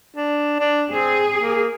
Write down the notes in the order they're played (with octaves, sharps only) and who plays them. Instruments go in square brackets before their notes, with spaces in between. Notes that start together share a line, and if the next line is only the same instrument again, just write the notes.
[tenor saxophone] D4
D4
[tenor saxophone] C4 [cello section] G#4
[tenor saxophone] A#3